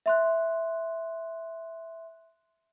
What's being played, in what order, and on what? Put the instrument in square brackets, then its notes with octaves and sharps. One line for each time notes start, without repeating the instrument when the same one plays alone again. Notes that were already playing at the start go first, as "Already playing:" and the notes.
[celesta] E5 C6 F#6